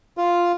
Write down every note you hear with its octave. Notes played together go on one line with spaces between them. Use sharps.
F4